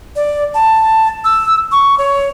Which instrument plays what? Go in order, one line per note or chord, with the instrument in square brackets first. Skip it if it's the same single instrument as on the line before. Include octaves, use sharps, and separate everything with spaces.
[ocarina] D5
A5
E6
C#6
C#5